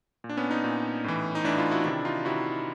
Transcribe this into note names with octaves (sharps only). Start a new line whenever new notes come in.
A#2
D4
B3 C#4
C#4 D#4
A#2
A2 E3
D#4
A2 E3 D4 E4
D#4 F4
E4 F#4
C3 D#3 D4 E4
D#4 F4
C3 D#3 E4 F#4